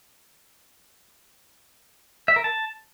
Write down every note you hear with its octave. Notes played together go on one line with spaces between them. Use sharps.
E5
A#4
A5